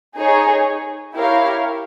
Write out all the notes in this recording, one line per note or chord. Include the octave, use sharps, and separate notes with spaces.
D#4 G#4 C#5
E4 G4 A#4 C#5 F5